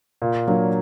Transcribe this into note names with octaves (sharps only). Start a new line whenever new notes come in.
A#2
F#3 A#3 D4